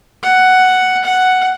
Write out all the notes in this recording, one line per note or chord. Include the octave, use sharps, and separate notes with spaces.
F#5
F#5